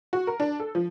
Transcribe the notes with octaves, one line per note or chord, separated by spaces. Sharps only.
F#4
A#4
D4
A4
F3